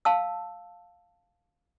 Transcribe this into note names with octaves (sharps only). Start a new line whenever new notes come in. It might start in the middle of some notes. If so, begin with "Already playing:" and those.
F5 A5 E6